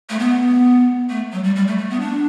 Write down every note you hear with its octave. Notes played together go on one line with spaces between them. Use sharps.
A3
B3
A3
F#3
G3
G3
A3
A3
B3
D4